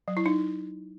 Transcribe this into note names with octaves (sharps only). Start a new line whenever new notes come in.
F#3
E4
D#4